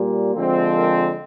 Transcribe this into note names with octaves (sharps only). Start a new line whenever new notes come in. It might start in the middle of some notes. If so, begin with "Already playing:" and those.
Already playing: A#2 G3 A#3
D3 F3 G#3 C4
A#4